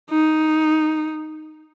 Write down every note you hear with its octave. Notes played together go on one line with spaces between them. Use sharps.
D#4